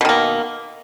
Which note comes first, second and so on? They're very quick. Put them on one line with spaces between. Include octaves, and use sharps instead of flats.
B2 D#3 A#3